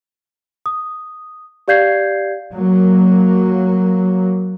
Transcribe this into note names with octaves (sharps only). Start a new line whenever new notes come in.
D#6
G4 D5 F5 G6 G#6 C7
F#3 A#3